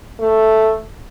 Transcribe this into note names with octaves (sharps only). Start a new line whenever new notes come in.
A3